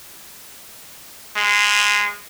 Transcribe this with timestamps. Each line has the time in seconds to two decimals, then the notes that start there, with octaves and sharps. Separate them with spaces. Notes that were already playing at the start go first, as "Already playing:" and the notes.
1.36 G#3